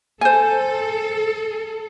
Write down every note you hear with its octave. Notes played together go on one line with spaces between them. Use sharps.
A4 C5 G#5